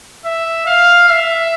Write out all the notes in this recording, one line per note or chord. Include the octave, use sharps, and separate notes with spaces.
E5
F5
E5